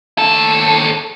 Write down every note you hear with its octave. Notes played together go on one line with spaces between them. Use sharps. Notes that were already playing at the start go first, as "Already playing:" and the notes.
D#2 A4